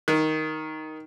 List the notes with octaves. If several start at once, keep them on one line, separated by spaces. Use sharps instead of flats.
D#3